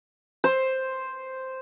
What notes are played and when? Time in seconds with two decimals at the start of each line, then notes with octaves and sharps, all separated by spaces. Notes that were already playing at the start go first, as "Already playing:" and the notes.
0.44 C5